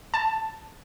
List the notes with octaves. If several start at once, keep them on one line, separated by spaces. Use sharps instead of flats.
A5